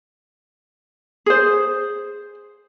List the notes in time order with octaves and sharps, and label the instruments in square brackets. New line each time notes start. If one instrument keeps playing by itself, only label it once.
[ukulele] G#4 C5